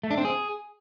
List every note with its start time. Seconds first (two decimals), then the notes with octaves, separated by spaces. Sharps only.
0.04 A3
0.11 D4
0.18 C4
0.25 G#4